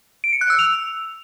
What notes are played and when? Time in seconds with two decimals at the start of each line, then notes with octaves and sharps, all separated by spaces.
0.24 D7
0.33 C#7
0.41 F#6
0.50 E6
0.59 F7